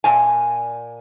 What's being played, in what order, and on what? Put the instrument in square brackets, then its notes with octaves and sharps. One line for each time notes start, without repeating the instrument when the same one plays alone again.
[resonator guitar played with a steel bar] A#2 G#5